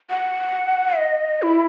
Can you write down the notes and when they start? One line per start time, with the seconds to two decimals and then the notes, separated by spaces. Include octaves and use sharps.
0.10 F#5
0.99 D#5
1.42 E4